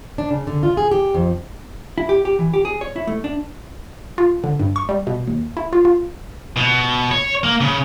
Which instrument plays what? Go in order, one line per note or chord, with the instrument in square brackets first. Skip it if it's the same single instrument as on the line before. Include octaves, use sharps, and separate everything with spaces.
[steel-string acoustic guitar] D4
C#3
D3
F4
G#4
G4
F2
[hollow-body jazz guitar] E4
G4
G4
E3
G4
G#4
C#5
E4
A3
D4
[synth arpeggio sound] F4
D3
G2
C#6
G3
B2
D#2
E4
F4
F4
[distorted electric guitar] B2
C#5
A#3
C#3